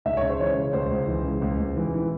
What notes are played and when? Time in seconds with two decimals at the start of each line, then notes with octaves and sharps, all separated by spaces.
0.05 C#2 E5
0.17 C#5
0.22 C#3
0.29 C5
0.40 E3 C#5
0.57 C#3
0.73 C#2 C5
0.91 C#2
1.08 E3
1.25 C#3
1.42 C#2
1.60 C#2
1.76 E3
1.94 E3